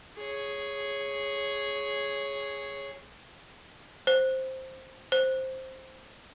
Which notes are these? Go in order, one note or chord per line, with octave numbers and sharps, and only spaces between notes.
G#4 C#5
C5
C5